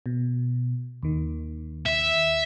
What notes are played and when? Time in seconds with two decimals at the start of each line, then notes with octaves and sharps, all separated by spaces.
0.06 B2
1.03 D#2 D#3
1.86 E5